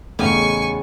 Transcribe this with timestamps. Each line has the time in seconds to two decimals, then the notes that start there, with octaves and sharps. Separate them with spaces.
0.19 E2 A2 C#3 D#4 G4 G#5 C#6